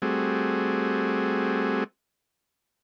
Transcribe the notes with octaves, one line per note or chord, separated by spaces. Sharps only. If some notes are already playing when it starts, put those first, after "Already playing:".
G3 A3 C4 F#4 G#4